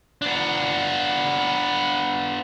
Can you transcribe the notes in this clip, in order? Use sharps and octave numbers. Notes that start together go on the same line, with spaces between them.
B3 D4